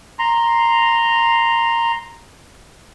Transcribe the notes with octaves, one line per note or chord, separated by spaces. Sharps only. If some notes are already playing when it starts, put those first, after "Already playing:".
A#5 C6